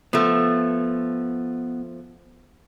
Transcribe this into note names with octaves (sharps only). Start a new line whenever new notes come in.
F3 A3 B3